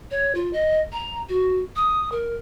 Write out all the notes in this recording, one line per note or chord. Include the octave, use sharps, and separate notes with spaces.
C#5
F4
D#5
A#5
F#4
D#6
A#4